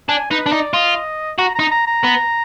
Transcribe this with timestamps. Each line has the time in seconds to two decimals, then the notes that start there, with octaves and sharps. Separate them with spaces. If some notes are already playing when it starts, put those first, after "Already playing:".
0.09 D4 G#5
0.30 D#4 B4
0.46 D4
0.52 D#4 D5
0.74 F4 D#5
1.39 F#4 A#5
1.55 D#4 A#5
1.71 A#5
1.87 A#5
2.03 B3